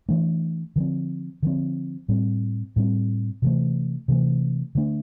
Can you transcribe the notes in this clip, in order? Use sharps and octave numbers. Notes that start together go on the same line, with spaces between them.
E3 A3 D4
D3 F3 C4
D3 F3 C4
A2 G3 C4
A2 G3 C4
C3 E3 A3
C3 E3 A3
D3 A3 D4